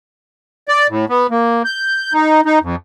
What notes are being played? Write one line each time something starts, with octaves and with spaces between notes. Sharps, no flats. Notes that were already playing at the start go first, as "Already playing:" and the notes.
D5
A2
B3
A#3
G6
D#4
D#4
F2